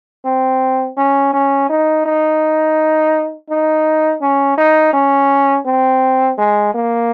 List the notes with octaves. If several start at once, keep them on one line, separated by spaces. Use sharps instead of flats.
C4
C#4
C#4
D#4
D#4
D#4
C#4
D#4
C#4
C4
G#3
A#3